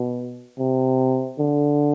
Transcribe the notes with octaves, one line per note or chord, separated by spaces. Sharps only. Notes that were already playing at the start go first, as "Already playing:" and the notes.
Already playing: B2
C3
D3